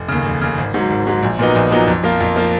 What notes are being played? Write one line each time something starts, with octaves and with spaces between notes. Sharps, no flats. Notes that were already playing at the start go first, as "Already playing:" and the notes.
Already playing: F1
D#2 C#3
F1
D#2 C#3
G#1
G#2 F#3
G#1
G#2 F#3
A#1
A#2 F#3 B3 D#4
A#1
A#2 F#3 B3 D#4
F2
F3 A#3 F4
F2
F3 A#3 F4